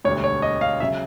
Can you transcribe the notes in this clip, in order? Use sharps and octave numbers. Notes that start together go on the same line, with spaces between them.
E1 D2 D3 G3 C#5
C#5
D#5
F5
C#3 F#3 E5